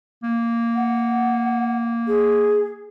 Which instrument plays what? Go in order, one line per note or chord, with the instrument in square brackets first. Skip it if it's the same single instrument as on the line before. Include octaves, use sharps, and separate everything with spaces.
[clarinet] A#3
[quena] F#5
G#4